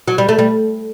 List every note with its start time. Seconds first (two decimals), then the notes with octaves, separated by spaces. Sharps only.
0.08 F#3
0.18 G3
0.29 A3
0.39 G3